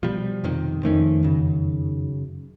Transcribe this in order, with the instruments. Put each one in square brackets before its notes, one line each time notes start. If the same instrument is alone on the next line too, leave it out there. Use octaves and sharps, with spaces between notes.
[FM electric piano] B2 [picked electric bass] F3 G3
[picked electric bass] F2 C3 D#3
[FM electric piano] F2 D#3 [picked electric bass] F3 A3 C#4
[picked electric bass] F#2 C#3